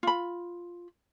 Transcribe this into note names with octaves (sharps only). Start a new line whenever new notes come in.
F4 B5